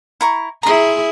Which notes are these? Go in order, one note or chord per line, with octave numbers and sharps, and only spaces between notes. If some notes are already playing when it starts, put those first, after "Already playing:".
E4 A#5 C#6
E4 G#4 A#5 C6